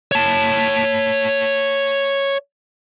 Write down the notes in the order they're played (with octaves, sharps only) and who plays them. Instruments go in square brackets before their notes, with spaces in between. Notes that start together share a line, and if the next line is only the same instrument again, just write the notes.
[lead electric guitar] C#5 A5